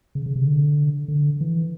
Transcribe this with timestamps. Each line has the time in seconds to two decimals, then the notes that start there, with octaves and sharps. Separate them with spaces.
0.15 C#3
0.26 C#3
0.36 C3
0.46 D3
1.08 D3
1.41 E3